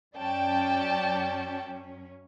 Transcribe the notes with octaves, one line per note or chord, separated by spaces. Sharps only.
F#2 F#3 C#4 D5 G5 A5